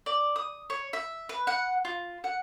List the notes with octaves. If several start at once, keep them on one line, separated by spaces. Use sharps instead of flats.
D5
D#6
C#5
E5
B4
F#5
F4
F#5